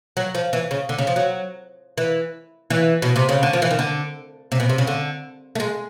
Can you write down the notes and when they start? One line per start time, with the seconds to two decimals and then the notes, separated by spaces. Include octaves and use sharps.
0.17 F#3
0.35 F3
0.53 E3
0.71 C#3
0.89 D3
0.98 C#3
1.07 F3
1.16 F#3
1.98 E3
2.70 E3
3.02 B2
3.16 C3
3.29 C#3
3.43 D3
3.53 F3
3.62 E3
3.71 D#3
3.79 D3
4.52 C3
4.60 B2
4.69 C3
4.78 C#3
4.87 D3
5.55 A3
5.60 G#3